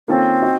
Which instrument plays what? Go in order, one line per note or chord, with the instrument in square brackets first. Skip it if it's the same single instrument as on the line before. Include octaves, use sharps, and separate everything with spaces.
[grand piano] D#3 A#3 C#4 F4 A4 [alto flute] C4
[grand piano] D#4 F#4